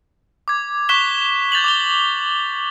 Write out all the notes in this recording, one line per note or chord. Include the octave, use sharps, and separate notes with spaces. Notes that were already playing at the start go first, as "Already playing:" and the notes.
D6 G#6
C#6 D6 F#6 B6 E7 G7
G6 A6 F7 F#7
D6 F7 G7